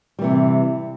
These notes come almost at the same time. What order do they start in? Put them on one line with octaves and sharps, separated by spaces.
G3 E3 C3